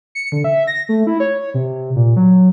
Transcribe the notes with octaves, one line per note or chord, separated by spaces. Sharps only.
C#7
D3
E5
A#6
A3
E4
C#5
C3
A#2
F#3